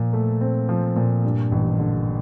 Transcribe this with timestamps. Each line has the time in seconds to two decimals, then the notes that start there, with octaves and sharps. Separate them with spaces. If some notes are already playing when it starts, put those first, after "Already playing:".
Already playing: A#2 F3
0.13 A3
0.41 C4
0.69 F3
0.96 A#2
1.24 G2
1.52 A1
1.79 D3